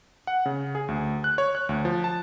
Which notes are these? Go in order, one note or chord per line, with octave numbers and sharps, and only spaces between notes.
F#5
C#3
G#4
D2
F#6
C#5
F#6
D2
F3
A5